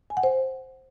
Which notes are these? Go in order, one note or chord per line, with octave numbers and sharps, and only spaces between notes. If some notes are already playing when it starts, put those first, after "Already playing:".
G#5
F#5
C5